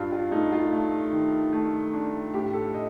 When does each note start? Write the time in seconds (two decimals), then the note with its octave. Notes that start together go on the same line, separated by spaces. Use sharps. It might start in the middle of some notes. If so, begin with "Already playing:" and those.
Already playing: G2 D4 F4
0.12 F4
0.31 A3 D#4
0.52 F4
0.72 A3
1.12 D#3
1.53 A3
1.93 D4
2.34 A2 G4
2.53 A4
2.74 D#5